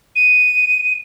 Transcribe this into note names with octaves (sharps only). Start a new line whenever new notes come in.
D#7